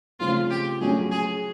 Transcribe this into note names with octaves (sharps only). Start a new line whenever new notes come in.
C#3 F3 A3 C4 F4
G4
F#3 A3 C#4 F#4 G#4
G#4